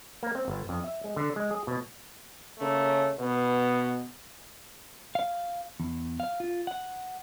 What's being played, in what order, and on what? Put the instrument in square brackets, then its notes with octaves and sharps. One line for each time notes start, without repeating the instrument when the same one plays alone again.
[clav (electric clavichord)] A#3
C4
G1
F2
E5
G#3
D3
G#3
G#4
B2
[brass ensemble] C#3 A3 A#3 C#4
B2 B3
[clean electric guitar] F5
E2
F5
F4
F#5